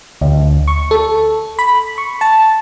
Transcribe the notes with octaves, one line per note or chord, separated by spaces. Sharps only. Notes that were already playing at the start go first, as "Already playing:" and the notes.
D2
C#6
A4
B5
C#6
A5